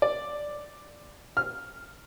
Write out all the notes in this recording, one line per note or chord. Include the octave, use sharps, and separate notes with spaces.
D5
F6